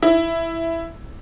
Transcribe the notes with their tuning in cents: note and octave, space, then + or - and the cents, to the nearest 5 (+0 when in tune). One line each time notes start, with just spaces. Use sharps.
E4 +5